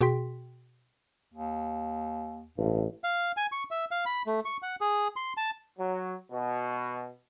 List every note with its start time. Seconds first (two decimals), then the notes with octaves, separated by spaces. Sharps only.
0.01 B2 F#4 G#4 G5 C6 B6
1.34 D#2
2.58 A1 G2
3.04 F5
3.37 G#5
3.52 C#6
3.71 E5
3.91 F5
4.06 B5
4.26 A3
4.45 C#6
4.62 F#5
4.81 G#4
5.16 C6
5.37 A5
5.78 F#3
6.30 B2